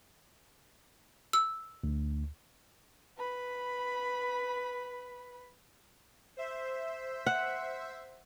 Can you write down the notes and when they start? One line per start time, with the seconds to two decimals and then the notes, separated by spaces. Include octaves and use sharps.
1.33 E6
1.84 D2
3.18 B4 B5
6.37 C5 E5
7.26 F#5